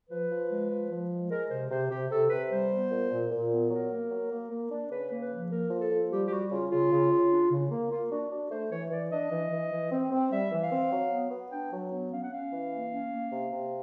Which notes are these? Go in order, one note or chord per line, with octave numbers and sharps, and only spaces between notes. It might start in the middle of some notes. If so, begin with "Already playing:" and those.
F3 B4
F3
G#3
F3
F3
G#3
G#3 A#4
C3 C5
C3 C5
C3 G4
C3 A4
C3 B4
G3 C5
B3
A#2
A#2
A#2
B3
F#3 A#4
A#3
F#3
A#3
A#3
D4
C#3 B4
A#3
B4
F3
A#3 A#4
F3
A4
F3
G3 G4
G4
G3 F#4
C#3 F4
C#3 F4
C#3
C#3
D4
C#3
A#3
A#3 F4
D4 F#4
D4 F#4
A3 C5
E3 C#5
E3 D5
D4 D#5
E3
E3
E3
C4
C4
G3 E5
E3
F5
C4
F#3
B3
B3
D4 G5
F#3
B3
C#4 F5
F#5
C#4 F5
E3
A#3
C#4
A#3
C3
C3